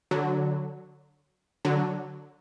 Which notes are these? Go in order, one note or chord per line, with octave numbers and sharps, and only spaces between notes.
D3 F#3
D3 F#3